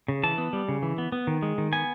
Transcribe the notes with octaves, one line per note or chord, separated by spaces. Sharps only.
C#3
E3 A5
B3
G3
C#3
E3
B3
B3
D#3
G#3
D#3
B3 G#5